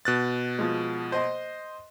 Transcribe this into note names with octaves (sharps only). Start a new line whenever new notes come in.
B2 F#6 A6
F3 G#3
C5 D#5 C6